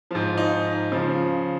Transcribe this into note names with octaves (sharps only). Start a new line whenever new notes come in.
G#2 F3
D#4
C#3 F3